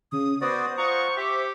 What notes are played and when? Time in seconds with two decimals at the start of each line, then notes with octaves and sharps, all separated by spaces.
0.12 C#3 D#6
0.41 B3 F#4 C5 D5 D#6
0.78 F4 F#5 A#5 C#6
1.17 G4 E5 D6